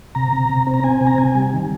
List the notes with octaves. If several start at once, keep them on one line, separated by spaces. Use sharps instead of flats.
C3 A#5
C3
C3
C4
A#5
C4 G#5
C3
A#5
C3 G#5
G3
D#3